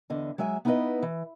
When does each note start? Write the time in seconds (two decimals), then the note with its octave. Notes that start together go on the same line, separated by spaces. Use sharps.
0.10 E2 D3 D#5
0.38 F#3 G#3 E5 G#5
0.65 B3 D#4 E4 G#4 B4 D#5
1.02 E3